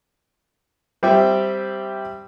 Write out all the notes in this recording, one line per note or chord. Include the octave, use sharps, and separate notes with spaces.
G3 C4 G4 E5 G5